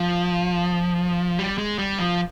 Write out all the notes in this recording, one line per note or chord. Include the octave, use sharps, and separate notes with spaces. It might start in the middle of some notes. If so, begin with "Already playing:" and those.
Already playing: F3
G3
G#3
G3
F3